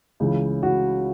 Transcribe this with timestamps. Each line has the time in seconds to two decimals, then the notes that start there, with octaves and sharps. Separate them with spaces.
0.20 C#2 C#3 E3
0.63 F#4